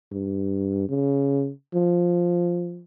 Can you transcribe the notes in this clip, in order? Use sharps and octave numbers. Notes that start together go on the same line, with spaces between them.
G2
C#3
F3